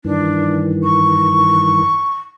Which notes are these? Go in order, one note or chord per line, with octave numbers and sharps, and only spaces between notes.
G2 D#3 E3 D4
C#6